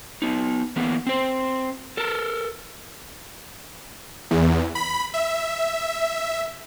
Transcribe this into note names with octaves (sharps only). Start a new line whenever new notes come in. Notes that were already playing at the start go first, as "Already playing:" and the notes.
B3 D#4
E3 A#3 B3
C4 C5
A4 A#4
E2
B5
E5